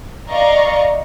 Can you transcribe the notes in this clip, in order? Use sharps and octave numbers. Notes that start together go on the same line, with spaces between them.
D5 D#5 F5 A#5 C#6